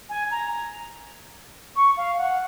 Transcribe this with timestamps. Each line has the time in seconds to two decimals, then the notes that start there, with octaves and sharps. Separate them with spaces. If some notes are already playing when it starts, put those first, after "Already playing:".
0.09 G#5
0.31 A#5
1.76 C#6
1.97 F5
2.18 F#5